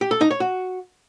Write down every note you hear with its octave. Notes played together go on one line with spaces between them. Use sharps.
G4
A4
D#4
C#5
F#4